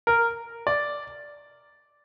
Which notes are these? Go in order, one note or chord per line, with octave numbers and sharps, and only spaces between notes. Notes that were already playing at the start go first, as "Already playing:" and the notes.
A#4
D5